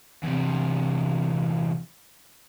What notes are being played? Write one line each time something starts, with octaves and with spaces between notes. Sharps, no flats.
E2 C3